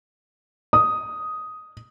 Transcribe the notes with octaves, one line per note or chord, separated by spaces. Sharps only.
D#6